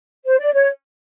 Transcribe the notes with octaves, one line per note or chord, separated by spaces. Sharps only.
C5
D5
C#5